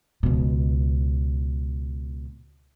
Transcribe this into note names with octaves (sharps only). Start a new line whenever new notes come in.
C#2 B2